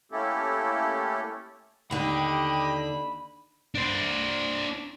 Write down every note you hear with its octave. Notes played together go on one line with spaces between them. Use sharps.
A3 A#3 C#4 E4 G4 A4
D#2 D3 G4 D#5 B5
D4 C5